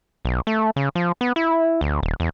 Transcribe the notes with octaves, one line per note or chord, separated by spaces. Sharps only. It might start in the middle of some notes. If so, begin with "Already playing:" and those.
B1
A3
C#3
F3
B3
E4
D2
D#1
E2